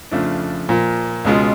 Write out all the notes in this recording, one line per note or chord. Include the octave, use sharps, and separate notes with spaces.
F2 C#3 F3 A3 D4
A#2 F3 A#3
C#2 B2 G#3 C#4 F4